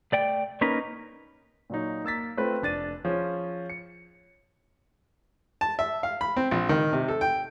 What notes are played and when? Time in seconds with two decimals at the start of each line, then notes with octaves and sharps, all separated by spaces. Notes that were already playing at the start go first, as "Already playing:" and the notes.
0.12 A3 D5 G5
0.61 A#3 C#4 D#4 A#4 B4
1.70 A#2 F#3 D#4
2.04 A#3 E6 A6 B6
2.37 A3 C4 F4 B4
2.62 F1 D4 A6 D#7
3.05 F3 C#4 G#4
3.70 C#7
5.61 A5
5.79 E5
6.03 F5
6.21 B5
6.36 C4
6.51 A#1
6.69 D#3
6.93 C3
7.08 A4
7.21 G5